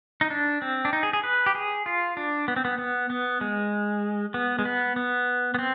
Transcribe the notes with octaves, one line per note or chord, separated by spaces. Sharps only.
D#4
D4
C4
D4
D#4
G#4
G#4
B4
G4
G#4
F4
D4
B3
C4
B3
B3
B3
G#3
B3
G#3
B3
B3
B3
C4